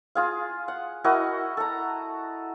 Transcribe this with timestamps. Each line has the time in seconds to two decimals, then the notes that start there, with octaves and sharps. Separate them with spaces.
0.15 F4 G#4 F5
0.68 F#5
1.04 E4 F#4 A#4 D#5
1.57 A4 A#5